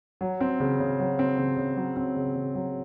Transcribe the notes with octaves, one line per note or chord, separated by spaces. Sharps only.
F#3
C4
C#3
C#3
F#3
C4
C#3
C#3
F#3
C4
C#3
C#3
F#3